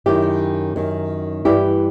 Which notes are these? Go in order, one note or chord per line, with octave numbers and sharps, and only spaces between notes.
F#2 D#3 E4 G4
F#2 D#3
G2 E3 E4 G4